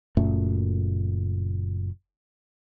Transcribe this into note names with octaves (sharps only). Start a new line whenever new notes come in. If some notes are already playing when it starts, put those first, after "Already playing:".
F#1 F#2 A#2 A3